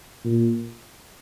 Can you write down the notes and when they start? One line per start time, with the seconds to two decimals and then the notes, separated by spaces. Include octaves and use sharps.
0.25 A#2